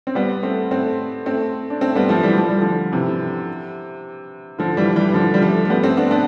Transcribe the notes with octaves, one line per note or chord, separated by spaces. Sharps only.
C4
G3 B3
A3 C4
A3 C4
A3 C4
D4
A3 C4
G3 B3
F3 A3
E3 G3
F3
G3
D3 F3
C3 E3
D3 F3
E3 G3
E3 G3
E3
D3 F3
G3
F3 A3
A3
G3 B3
A3 C4
B3 D4
B3 D4